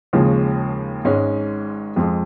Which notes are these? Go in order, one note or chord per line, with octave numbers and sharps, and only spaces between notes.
D#2 C#3 F3 G#3
G#1 G#2 G#3 C#4
F2 F3 G#3